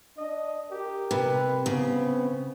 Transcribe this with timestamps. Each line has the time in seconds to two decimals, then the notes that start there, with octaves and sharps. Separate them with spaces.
0.18 D4 D#5
0.71 G4 A#4
1.11 C3 B4
1.66 C#3 B3 C4